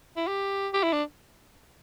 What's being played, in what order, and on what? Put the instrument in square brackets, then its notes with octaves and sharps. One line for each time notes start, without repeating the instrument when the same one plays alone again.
[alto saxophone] E4
G4
G4
E4
D4